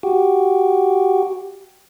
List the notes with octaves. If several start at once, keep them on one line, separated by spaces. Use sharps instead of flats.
F#4 G4